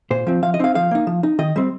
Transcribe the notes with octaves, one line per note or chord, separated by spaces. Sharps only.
A#2 C5
F3 C4
F3 F5
D#5
C4 D#4 F5
F3 F5
A#3 D#4
F3
D#4
D#3 D#5
G3 C4